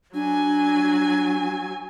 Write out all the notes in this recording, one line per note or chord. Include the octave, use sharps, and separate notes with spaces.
F#3 D4 G#5